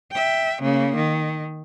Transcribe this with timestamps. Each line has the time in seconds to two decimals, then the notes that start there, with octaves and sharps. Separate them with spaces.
0.12 E5 G5
0.62 C#3 A#3
0.96 D#3